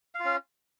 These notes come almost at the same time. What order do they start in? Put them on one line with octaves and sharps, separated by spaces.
F5 F4 C#4